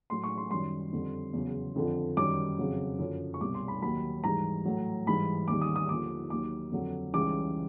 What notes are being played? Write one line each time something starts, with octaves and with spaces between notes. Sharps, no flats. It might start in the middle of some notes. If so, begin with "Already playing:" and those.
A2 F#3 C6
C#6
C6
F#2 D#3 G3 C6
F2 D3 G3
E2 C#3 F#3
F2 D3 F3
F#2 D#3 G3 D6
F2 C#3 F#3
F#2 D3 F3
C#6
C2 B2 G3 D6
C6
B5
D#2 D#3 F#3 B5
G#2 E3 G3 A#5
A2 F#3
G#2 E3 G3 B5
D#2 D#3 G3 D6
D#6
D#6
D#2 D3 F3 D6
D#2 D#3 F#3 D6
F2 D3 F#3
C#2 C#3 E3 G3 D6